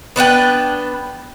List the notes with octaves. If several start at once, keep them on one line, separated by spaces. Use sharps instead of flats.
B3 D4 B4 G5